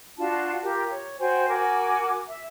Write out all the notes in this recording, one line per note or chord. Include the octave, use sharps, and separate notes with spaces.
D4 F4 F#4 A5
F4 G4 A#4
C#5
F#4 C5 G5 G#5
F#4 A#4 G#5 D6
E5